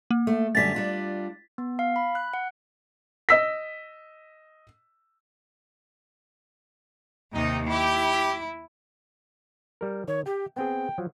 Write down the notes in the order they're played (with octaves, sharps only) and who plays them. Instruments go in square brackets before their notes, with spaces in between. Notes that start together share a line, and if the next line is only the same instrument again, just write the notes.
[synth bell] A#3
[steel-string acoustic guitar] A3
[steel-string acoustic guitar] F#2 D3 G3 [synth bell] A6 B6
[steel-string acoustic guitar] G3 D4 F4
[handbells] B3
F5
B5
F#6
F#5
[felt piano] D#5 E6 B6
[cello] D#2 C3 [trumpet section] D#4
[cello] E4 [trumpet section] G4
[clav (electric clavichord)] G3 A#4
[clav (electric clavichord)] D#3 [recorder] C#5
[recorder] G4 [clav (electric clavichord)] G5
[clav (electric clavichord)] B3 C4 G#4 [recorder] G5
[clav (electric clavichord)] F3 F#3